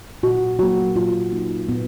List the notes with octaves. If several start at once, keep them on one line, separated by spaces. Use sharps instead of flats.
A#2 F#4
F#3 A#3 F#4
A#2 F4
F#3 A#3 D#4
A#2 B3